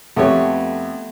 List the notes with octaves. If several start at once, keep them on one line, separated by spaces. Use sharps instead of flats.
F2 A3 B3 G4 C#5